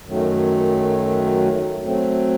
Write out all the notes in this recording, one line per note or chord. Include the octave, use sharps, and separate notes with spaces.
F#2 D#3 F#3 A3
F#3 A3 C4